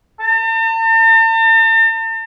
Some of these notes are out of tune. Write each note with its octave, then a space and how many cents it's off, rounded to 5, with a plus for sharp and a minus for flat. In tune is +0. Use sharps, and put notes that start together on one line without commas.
A5 +45